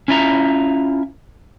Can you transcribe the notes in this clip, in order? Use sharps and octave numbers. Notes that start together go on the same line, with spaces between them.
C#4 E4 F4 E5 A#5